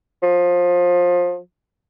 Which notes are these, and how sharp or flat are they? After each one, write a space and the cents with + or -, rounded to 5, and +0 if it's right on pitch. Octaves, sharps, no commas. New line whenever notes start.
F3 +20